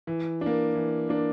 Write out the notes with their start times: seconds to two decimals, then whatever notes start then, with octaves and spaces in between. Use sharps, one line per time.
0.07 E3
0.41 A#3 D4
0.75 E3
1.09 A#3 D4